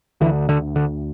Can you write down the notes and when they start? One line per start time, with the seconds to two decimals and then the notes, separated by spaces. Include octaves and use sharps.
0.21 D2 D3 E3
0.49 D3
0.76 D3